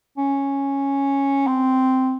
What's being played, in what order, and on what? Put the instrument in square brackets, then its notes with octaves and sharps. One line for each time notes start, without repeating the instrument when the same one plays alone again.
[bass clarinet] C#4
C4